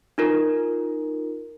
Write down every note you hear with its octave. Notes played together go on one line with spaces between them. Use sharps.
D#4 F4 A#4